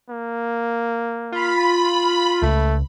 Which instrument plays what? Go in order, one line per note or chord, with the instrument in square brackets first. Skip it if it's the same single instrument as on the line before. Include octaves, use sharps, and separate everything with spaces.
[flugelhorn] A#3
[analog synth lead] F4 [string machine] B5
[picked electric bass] C#2 [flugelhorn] A3